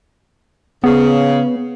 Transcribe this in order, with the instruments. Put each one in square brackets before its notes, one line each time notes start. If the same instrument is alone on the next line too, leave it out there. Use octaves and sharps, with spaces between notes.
[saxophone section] C#3 [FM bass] B3